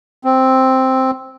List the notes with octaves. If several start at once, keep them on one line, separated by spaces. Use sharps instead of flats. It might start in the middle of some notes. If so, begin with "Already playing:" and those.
C4